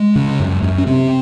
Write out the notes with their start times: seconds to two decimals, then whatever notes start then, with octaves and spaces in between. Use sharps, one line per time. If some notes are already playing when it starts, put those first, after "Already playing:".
Already playing: G#3
0.16 C#3
0.40 F#2
0.62 F#2
0.78 C#4
0.86 C3 C4